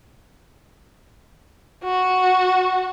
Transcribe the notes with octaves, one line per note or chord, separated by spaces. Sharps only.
F#4